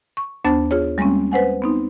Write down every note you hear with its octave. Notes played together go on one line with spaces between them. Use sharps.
C#6
D#2 B3 D4 C5 A5 A6
F4 G#4 C#5
G3 G#3 A#3 C4 C#4
B4 C5 F#5 G#5
B3 C4 D#4